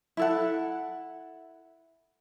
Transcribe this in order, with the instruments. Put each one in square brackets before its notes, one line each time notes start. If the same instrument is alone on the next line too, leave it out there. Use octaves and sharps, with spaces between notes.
[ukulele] E4 A4 F#5